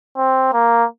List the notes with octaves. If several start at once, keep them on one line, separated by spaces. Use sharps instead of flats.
C4
A#3